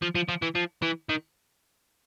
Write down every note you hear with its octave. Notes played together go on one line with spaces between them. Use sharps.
F3
F3
F3
E3
F3
E3
D#3